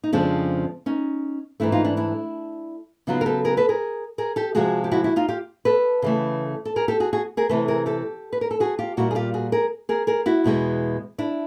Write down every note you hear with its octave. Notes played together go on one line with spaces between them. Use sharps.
D#4
F2 C#3 F3 G#3 C4 D4
C#4 D#4
G#2 E3 A3 D4 E4
D#4 F4
D4 E4
D4 E4
C#3 F#3 B3 D#4 F4
A#4
G4 A4
G#4 A#4
A4 B4
G#4 A#4
G#4 A#4
G4 A4
C3 F3 G#3 F#4 G#4
G4
E4 F#4
E4 F#4
D#4 F4
F4 G4
A4 B4
C#3 E3 A3
A4
G#4 A#4
G4 A4
F#4 G#4
F#4 G#4
G#4 A#4
C3 E3 A3 A4 B4
G#4 A#4
G4 A4
B4
A#4
A4
F#4 G#4
F4 G4
A#2 G3 A#3 E4 F#4
G#4
F4 G4
F#4 G#4
G#4 A#4
G#4 A#4
G#4 A#4
E4 F#4
E2 B2 G#3 B3
D4 E4